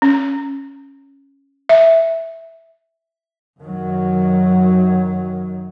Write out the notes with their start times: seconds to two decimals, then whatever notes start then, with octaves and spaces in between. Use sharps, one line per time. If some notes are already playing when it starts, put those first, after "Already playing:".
0.02 C#4
1.69 E5
3.61 F#2 D#3 F#3